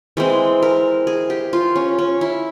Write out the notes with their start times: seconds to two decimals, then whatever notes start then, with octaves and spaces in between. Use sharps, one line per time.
0.17 E3 G#3 C4
0.62 A#4
1.07 G#4
1.30 G4
1.53 F4
1.76 C#4
1.99 C#4
2.21 E4